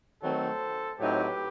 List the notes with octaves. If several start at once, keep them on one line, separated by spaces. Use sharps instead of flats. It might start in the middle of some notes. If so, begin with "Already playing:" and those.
D#3 F#3 A3 C4 A4 C5
A2 F#3 C4 D#4 G4 B4